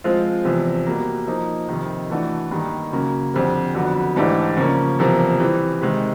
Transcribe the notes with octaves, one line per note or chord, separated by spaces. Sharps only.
F3 G#3 C4 F4
E2 C3 F3
B2 G3 A#3
F3 A#3 D#4
F2 C3 D#3
E3 A3 D4 F#4
G2 D#3 G3 A#3
C#3 F#3 A#3
F2 D3 G3 C4
F2 D3 F#3 B3
G#2 E3 A3 D4 G4
C#3 F3 A#3 C#4
E2 C3 F3 A#3
E3 G3 C4
C3 D#3 G#3